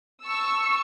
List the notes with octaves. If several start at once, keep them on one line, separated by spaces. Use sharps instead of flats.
A5 C#6 E6